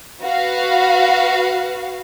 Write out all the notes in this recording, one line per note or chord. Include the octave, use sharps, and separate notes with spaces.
F#4 B4 F5